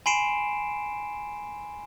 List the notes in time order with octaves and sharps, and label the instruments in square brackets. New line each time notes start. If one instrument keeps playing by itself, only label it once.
[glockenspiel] G#5 B5 C6 C7 D7 E7